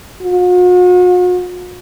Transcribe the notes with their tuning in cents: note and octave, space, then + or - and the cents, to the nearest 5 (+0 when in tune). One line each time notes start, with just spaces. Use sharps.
F#4 -45